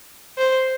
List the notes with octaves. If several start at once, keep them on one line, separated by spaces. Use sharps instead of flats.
C5